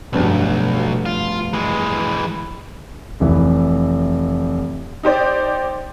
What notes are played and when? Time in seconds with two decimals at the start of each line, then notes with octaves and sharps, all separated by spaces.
0.13 F1 B1 G2 B2
1.06 F4
1.53 E3 G#3
3.20 F1 E3 E5
5.03 D#4 G4 C5 D5